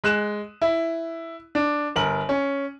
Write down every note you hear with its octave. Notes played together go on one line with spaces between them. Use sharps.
G#3 F#6 E7
E4
D4
G1 A#4 F#7
C#4